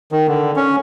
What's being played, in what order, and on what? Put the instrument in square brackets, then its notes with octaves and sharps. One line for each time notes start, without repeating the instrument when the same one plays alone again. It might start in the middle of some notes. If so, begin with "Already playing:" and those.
[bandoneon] D#3
D3
C#4